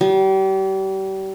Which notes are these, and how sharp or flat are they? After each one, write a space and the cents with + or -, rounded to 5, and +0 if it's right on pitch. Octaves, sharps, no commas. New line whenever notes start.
G3 -35